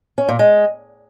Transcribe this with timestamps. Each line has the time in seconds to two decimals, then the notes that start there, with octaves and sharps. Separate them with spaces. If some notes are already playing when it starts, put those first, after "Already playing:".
0.18 C#4
0.29 A#2
0.39 G#3